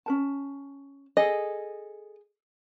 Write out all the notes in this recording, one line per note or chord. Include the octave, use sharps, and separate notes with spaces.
C#4 A#4 A5
G#4 A4 D#5